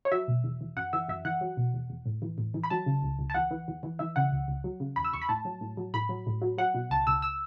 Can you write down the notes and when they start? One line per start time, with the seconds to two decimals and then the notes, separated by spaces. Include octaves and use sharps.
0.05 C#5
0.12 F#3 E5
0.28 B2
0.44 E2
0.61 E2
0.77 F#2 F#5
0.93 E3 E5
1.08 F#2 E5
1.25 E3 F#5
1.41 F#3
1.57 B2
1.74 E2
1.89 E2
2.05 A2
2.22 E3
2.38 A2
2.54 E3
2.63 B5
2.70 F#3 A5
2.86 C#3
3.02 C#2
3.19 C#2
3.30 A5
3.34 E2 F#5
3.51 E3
3.68 E2
3.83 E3
3.99 E3 E5
4.16 C#3 F#5
4.32 C#2
4.48 C#2
4.64 F#3
4.80 C#3
4.96 E2 B5
5.05 E6
5.13 E2 C#6
5.22 B5
5.29 A2 A5
5.45 F#3
5.61 A2
5.77 F#3
5.94 A2 B5
6.09 F#3
6.27 A2
6.42 F#3
6.58 F#3 F#5
6.74 B2
6.90 C#2 A5
7.07 C#2 E6
7.22 E6